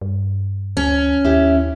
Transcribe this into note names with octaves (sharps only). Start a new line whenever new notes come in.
G2
D2 C#4
D#2 E4 G4